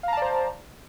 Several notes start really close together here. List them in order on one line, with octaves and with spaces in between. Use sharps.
F5 A#5 A5 D5 C5